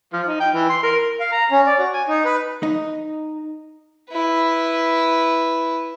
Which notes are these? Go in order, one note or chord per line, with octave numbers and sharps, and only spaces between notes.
F3
D#4
G5
E3
C6
A#4
F5
A#5
C#4
D5
F#4
G#5
D#4
B4
D#4
E4 B4